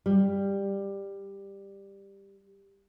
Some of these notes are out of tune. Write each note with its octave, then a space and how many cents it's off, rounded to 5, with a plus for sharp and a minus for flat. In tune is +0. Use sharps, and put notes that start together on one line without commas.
G3 +10